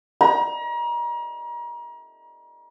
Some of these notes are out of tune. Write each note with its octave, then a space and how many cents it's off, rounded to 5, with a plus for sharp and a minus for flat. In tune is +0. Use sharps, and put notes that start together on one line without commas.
A#5 +35